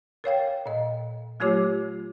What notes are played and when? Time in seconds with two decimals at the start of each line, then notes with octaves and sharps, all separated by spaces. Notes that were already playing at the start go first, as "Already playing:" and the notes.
0.24 A#4 C#5 F5 G5
0.66 A#2 D#5
1.40 F#3 A3 F4 G4 C#5 D6